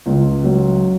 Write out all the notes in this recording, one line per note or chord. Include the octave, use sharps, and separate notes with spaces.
C#2
F#3